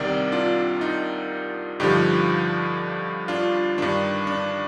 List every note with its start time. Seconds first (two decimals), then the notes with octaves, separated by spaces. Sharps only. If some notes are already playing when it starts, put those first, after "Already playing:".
Already playing: C2 C3 D#3 A#4 D5
0.32 D4 F4
0.81 D#4
1.80 G2 D3 F3 D#4 G4
3.28 D4 F4
3.78 G2 D#3 D4
4.27 D4